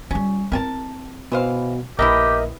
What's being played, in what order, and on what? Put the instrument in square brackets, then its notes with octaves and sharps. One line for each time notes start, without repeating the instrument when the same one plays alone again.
[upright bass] G3 F4 [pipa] C#4
[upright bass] C4 E4 [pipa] A#4 G#5 A5
[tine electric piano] B2 [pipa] E3 C5 F5
[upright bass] A#1 [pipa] G3 B3 E4 [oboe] G4 [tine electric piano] A#4 D#5 E5